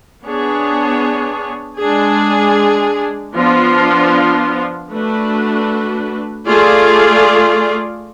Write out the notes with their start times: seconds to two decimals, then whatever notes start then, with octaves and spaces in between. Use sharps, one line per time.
0.23 B3 D4 G#4 C#5
1.79 G#3 D4 G#4
3.35 F3 B3 D4 F4
4.91 A3 D4 F#4 B4
6.48 A3 F4 G#4 D5